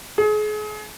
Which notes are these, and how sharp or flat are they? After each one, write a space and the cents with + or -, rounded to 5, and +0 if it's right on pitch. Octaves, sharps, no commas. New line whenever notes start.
G#4 +35